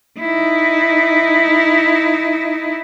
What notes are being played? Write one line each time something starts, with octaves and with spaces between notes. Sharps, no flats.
D#4 E4